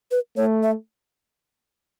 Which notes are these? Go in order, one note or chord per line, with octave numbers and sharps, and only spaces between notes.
B4
A3 C#5
E5